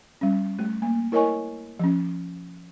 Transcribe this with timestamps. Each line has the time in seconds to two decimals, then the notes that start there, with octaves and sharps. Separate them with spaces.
0.21 G3 C#4
0.59 A3
0.82 A#3
1.12 E4 A#4 C#5 D#5 G#5 C#6
1.79 F3 C#4